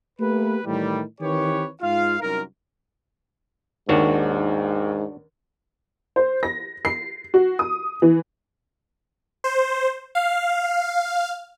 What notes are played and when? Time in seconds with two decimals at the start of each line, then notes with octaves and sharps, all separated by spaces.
0.20 A3 A#3 G4 B4
0.65 A2 D#3 E3 G3
1.21 D#3 E3 C4 G4 B4 C#5
1.81 G#2 F4 F5
2.21 C2 F#2 D#4 A#4
3.89 D#2 G#2 D4 F#4 C#5
6.16 C5
6.43 A#6
6.85 C7
7.34 F#4
7.59 D#6
8.02 E3
9.44 C5
10.15 F5